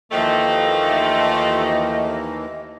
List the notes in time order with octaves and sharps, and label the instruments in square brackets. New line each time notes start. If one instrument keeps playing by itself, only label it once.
[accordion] D#2 E3 A#3 [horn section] F3 A3 [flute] D#5 [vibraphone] E5 G5